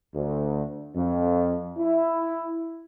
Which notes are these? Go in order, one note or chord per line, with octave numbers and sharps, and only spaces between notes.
D2
F2
E4